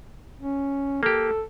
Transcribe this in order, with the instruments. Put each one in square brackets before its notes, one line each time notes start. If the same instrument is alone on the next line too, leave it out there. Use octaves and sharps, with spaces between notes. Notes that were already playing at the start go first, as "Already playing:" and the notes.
[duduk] C#4
[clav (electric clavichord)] A#3 G4 [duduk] A4